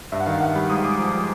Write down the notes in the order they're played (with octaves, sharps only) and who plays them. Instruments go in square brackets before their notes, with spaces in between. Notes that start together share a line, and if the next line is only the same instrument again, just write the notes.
[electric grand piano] G2 E5
F#5
D#3 F5
G2 F#5
G3 B5
G#2 D#6
G#3 D6
F3
F3